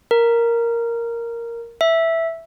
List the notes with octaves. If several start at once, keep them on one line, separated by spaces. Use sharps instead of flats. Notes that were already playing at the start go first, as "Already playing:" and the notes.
A#4
E5